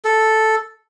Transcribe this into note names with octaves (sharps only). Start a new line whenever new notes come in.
A4